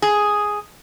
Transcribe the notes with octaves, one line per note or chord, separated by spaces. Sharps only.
G#4